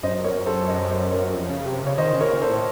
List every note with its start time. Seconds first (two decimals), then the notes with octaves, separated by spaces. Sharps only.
0.03 F#2 C5 D#5
0.25 A#4 C#5
0.46 A4 C5
0.68 C5 D#5
0.90 C5 D#5
1.11 A#4 C#5
1.34 F2
1.50 C#3
1.66 C3
1.83 C#3 C#5
1.98 D#3 C5 D#5
2.14 C#3
2.21 A#4 C#5
2.31 A#2
2.41 A4 C5
2.48 A2